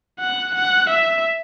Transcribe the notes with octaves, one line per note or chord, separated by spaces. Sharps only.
F#5
F#5
E5